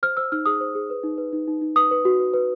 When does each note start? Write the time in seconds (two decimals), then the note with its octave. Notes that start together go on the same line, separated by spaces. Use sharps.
0.03 C5 F6
0.17 C5 E6
0.32 D#4 F6
0.46 G#4 D#6
0.61 C5
0.75 G#4
0.90 B4
1.03 D#4
1.18 B4
1.33 D#4
1.48 D#4
1.61 D#4
1.76 B4 D#6
1.91 B4
2.05 F#4
2.19 B4
2.34 B4